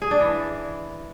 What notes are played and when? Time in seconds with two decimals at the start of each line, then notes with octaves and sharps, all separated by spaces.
0.02 G#4
0.11 D4
0.20 E3